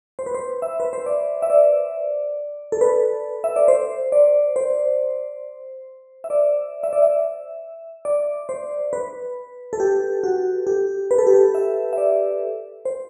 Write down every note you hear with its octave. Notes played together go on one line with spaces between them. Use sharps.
C5
B4
C5
E5
B4
C5
D5
E5
D5
A4
B4
E5
D5
C5
D5
C5
E5
D5
E5
D5
E5
D5
C5
B4
A4
G4
F#4
G4
B4
A4
G4
A4
E5
E5
D5
C5